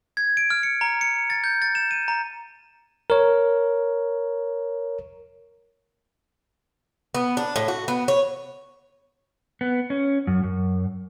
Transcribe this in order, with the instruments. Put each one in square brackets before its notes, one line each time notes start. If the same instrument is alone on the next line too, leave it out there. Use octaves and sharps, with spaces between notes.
[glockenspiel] G#6
D7
F6
C#7
A#5
C#7
A6
G6
A6
E7
D#7
A#5
[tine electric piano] A#4 C#5
[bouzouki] B3
D4
A2
F#4
B3
C#5
[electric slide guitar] B3
C#4
F#2
F#2